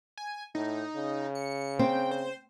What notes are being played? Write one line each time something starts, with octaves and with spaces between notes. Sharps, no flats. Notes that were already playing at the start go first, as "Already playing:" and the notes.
G#5
A2 D#4
C#3
C#7
C4 G5
C5